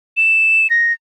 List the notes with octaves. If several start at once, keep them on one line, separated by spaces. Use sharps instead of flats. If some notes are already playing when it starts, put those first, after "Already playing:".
E7
A#6